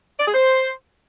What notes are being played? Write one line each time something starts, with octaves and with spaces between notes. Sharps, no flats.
D5
G#4
C5